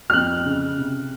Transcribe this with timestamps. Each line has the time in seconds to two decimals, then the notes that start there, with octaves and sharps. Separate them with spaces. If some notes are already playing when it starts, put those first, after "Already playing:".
0.10 F6
0.13 F2 F#6
0.46 C#3
0.78 C3